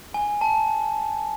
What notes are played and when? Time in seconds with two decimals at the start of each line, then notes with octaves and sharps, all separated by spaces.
0.14 G#5
0.41 A5